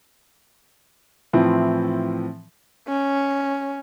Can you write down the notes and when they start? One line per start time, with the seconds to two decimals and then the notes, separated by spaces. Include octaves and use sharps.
1.33 A2 E3 F3 C4 E4
2.88 C#4